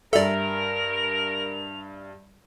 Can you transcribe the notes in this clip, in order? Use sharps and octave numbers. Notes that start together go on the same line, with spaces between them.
G2 A4 A#4 D5 E5 F7